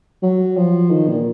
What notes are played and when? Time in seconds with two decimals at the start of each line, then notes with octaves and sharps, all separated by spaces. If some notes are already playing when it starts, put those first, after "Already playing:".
0.22 F#3
0.57 F3
0.91 D#3
1.08 A#2